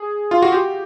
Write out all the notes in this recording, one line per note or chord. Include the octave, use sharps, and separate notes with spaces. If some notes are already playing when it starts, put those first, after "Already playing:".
Already playing: G#4
F4
F#4
G4